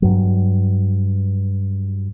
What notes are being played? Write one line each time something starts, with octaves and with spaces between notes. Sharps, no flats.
G2 F#3